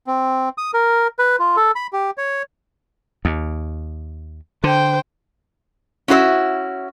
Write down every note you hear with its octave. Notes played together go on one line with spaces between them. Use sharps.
C4
D#6
A#4
B4
F4
A4
B5
G4
C#5
D#2
D3 C5 G5
C#4 E4 F#4 C5 E5